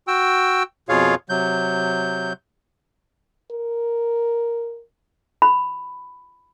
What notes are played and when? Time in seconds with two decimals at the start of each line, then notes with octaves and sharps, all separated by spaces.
0.08 F#4 G5 E6
0.89 F2 B2 F4 G#4 C#5 F5
1.29 C3 F#3 G6
3.51 A#4
5.42 B5